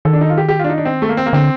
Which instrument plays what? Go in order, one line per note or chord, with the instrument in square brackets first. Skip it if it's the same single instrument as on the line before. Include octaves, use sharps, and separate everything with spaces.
[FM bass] D#3 [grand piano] A4
[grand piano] D4
D#4
F4
G4
G4
D4 F4
D#4
D4
C4
A3
A#3
C4
A#3
[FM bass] D3 [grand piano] C4